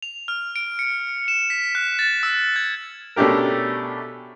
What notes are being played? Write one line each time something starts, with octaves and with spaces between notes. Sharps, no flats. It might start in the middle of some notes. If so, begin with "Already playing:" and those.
F7
F6
D7
C#7
E7
B6
F#6
A6
E6
G#6
B2 A3 C#4 D4 G4 A#4